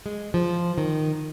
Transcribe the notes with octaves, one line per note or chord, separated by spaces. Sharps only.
G#3
F3
D#3